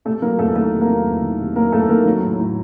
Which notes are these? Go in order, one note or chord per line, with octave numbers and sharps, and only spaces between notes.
C3 A3 A4
F#3 A#3 A#4
E2 A3 A4
D#3 A3 A4
C3
A#3 A#4
F#3
E2
D#3
C3
F#3 A#3 A#4
E2 A3 A4
D#3 A#3 A#4
F#3
A2
A2